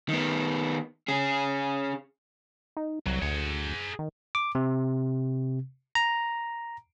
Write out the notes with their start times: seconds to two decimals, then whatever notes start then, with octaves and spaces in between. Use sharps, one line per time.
0.09 D#3 B3
1.08 C#4 G#4
2.77 D#4
3.06 C2 F#3
3.22 D2 G#4 F#5
3.99 D#3
4.35 D6
4.55 C3
5.95 A#5